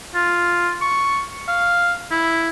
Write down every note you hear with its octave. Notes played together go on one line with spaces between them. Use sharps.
F4
C#6
F5
E4